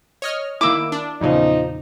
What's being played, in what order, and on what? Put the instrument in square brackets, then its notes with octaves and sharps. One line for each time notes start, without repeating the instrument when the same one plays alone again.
[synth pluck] C#5 D#5 F6
[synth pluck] D#3 A#3 E4 [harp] D6 E6
[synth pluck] D4
[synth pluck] E2 A#2 C#3 [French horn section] F3 D#4